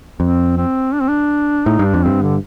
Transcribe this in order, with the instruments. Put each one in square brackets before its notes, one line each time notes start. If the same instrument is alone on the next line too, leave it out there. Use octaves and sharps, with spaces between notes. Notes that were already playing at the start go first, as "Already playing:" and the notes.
[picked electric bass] F2 [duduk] C4
[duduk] C4
D4
C4
D4
[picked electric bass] A2 [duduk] D#4
[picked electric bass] G2
[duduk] D4
[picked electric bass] F2
[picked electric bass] G2 [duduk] C4
[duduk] D3